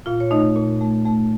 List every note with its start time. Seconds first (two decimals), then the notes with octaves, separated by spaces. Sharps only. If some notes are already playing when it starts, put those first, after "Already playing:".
0.06 A#2 F4 F5
0.20 C#5
0.30 A3 D#4 D#5
0.56 A#2
0.81 A3
1.05 A3